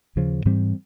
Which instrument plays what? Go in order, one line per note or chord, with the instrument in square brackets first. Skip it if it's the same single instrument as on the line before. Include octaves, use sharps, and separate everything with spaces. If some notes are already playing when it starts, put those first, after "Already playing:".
[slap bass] D#2 C#3 F3
G#2 E3 G3 C4